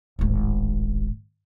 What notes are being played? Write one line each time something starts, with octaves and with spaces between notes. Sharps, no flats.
D1 G#1